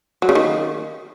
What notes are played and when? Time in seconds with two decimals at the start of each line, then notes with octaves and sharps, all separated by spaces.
0.22 F#3
0.29 C#3
0.35 D#3